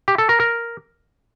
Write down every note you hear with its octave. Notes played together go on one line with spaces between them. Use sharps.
G4
A4
A#4
A#4